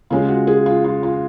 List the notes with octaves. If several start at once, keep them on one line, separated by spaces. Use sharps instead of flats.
C#3 G#3 C#4 F4
F#4
G#4
F4
F4
F4